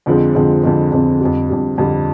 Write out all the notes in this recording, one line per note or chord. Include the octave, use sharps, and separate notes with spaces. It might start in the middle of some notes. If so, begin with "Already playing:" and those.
F2 D3 F3 G#3 C4
F2 D3 F3 G#3 C4
F2 D3 F3 G#3 C4
F2 D3 F3 G#3 C4
F2 D3 G3
F2 D3 G3
F2 D3 G3